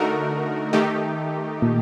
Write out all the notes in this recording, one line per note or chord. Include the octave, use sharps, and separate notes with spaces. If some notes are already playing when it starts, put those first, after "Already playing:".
Already playing: D3 A3 D#4 F#4 A#4
D#3 A3 D#4 G4
A#2